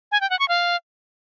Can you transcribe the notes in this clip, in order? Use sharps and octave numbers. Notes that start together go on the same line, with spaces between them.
G#5
G5
F#5
C#6
F5